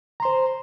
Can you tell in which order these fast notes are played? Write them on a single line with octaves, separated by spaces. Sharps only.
A#5 C6 C5